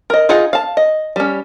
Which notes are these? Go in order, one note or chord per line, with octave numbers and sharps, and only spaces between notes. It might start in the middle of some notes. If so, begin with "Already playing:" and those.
A#4 D#5
D#4 F4 G#4 D#5 F#5
F5 A5
D#5
G3 C#4